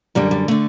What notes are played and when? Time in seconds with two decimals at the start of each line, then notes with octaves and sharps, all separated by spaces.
0.15 F#2 D3 G3
0.31 G3
0.48 D3 A3